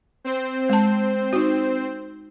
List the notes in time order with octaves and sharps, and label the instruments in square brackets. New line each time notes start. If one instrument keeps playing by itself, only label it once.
[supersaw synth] C4 C5
[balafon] G#3 A5
D#4 F#4